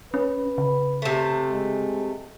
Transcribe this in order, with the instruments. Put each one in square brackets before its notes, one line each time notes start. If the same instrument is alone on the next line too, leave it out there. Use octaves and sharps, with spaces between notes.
[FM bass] C#4 [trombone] B4
[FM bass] C#3
[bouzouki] C3 A3
[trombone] G#3